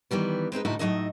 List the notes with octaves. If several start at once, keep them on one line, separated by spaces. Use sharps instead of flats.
D#3 E3 G3 B3
G#3 C4 D#4 B4
D2 A2 C3 D#4 E4 F#4
A2 F#3 G#3 D#4 D#5 E5